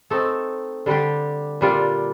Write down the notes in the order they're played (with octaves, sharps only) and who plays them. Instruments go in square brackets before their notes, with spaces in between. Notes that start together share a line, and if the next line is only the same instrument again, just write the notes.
[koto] A3 C4 D#4 A4
D3 G3 D4 G4
A#2 G3 D4 F4